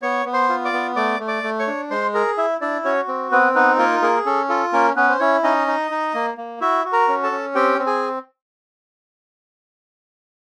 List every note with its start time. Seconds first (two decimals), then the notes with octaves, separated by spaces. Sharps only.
0.02 B3 C#5 C#6
0.26 B3
0.33 C5 C6
0.49 F4
0.65 D5 D6
0.73 B3
0.96 A3 D5 D6
1.20 A3
1.28 D5 D6
1.43 A3
1.59 C#5 C#6
1.67 D4
1.91 G#3 C5 C6
2.14 G#4 A#4 A#5
2.38 E4 E5
2.61 D4 E4 D5
2.85 C#4 F#4 C#5
3.08 C4
3.32 B3 C4 B4
3.55 B3 D#4 B4
3.78 A#3 F4 A#4
4.02 A#3 G#4 A#4
4.26 C#4 A4
4.49 F4 A4
4.73 A#3 C#4 A#4
4.96 B3 C#4 B4
5.09 C5
5.20 C#4 E4 C#5
5.43 C#4 D#4 D#5
5.67 D#4
5.91 D#4
6.14 A#3
6.38 A#3
6.61 E4 F#4 E5
6.85 F#4
6.93 A#4 A#5
7.08 C#4
7.23 A4 A5
7.31 C#4
7.55 C4 G4 G5
7.79 C4
7.87 G#4 G#5